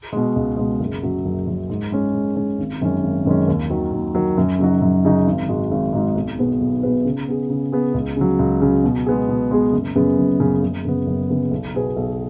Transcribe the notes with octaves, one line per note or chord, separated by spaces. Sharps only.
B2 G#3
C#2
B2 G#3
F#1
F#2 F#3
F#1
F#2 F#3
G#2
G#3 C#4
G#2
G#3 C#4
G#1
F#2 D#3 G#3 C#4
G#1
F#2 D#3 G#3 C#4
D#2
D#3 F#3
D#2
D#3 F#3
F#2
C#3 F#3 D#4 F#4
F#2
C#3 F#3 D#4 F#4
G#1
G#2 G#3 D#4 F#4
G#1
G#2 G#3 D#4 F#4
B1
B2 B3 G#4 B4
B1
B2 B3 G#4 B4
C#3
B3 G#4
C#3
B3 G#4
C#2
C#3 F#3
C#2
C#3 F#3
B2
G#3 B3 G#4
B2
G#3 B3 G#4
F#1
F#2 C#3 B3 G#4
F#1
F#2 C#3 B3 G#4
F#1
F#2 C#3 B3
F#1
F#2 C#3 B3
B1
B2 B3 G#4 B4
B1